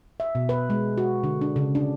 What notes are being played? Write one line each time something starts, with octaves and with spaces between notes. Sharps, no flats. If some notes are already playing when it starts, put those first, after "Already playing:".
E5
B2
B4
G#3
F#4
D3
D4
C#3
D4